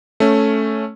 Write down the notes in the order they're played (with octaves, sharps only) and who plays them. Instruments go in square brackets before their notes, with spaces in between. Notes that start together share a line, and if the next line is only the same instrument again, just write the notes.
[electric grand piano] A3 C#4